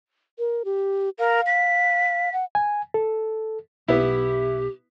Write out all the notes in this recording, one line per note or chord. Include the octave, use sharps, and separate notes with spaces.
A#4
G4
A#4 F5
B6
F#5
G#5
A4
B1 B3 E4 G4